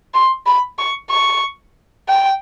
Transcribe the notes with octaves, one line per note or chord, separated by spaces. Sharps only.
C6
B5
C#6
C#6
G5